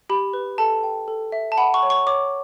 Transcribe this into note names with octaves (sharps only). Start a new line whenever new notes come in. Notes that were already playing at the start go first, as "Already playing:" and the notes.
G4 B5
B4
A4 A5
G5
A4
E5
A5
F#5 B5
C#6
C#5
C#6
C#5 D6